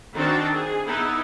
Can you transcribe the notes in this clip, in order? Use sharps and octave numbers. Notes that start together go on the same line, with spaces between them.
D#3 C4 D4 F#4 G5 A5
G#4
B3 D#4 E4